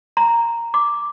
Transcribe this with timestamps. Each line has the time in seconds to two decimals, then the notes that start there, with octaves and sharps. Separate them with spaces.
0.17 A#5
0.74 D6